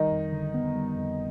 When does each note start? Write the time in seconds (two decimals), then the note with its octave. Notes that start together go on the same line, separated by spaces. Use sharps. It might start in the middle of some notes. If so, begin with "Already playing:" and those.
Already playing: D#3 G3 D#4
0.12 F2
0.32 D3
0.54 B3
0.76 G3
0.97 F2